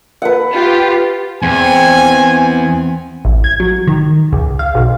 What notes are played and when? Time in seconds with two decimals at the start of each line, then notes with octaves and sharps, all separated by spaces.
0.22 B4 F#5
0.53 F4 G4
1.43 E2 C4 G#5
3.25 A1
3.44 G#6
3.60 F#3
3.87 D#3
4.33 C#2
4.59 F5
4.75 B1